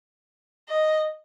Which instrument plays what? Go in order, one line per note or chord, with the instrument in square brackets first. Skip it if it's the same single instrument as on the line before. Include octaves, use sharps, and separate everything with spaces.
[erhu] D#5